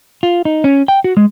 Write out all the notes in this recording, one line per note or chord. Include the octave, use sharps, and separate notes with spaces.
F4
D#4
C#4
G5
F#4
G#3